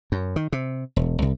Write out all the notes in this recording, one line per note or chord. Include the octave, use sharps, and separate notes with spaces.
F#2
D#3
C3
E1
C2